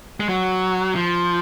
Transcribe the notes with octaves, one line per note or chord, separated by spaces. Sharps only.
G#3
F#3
F3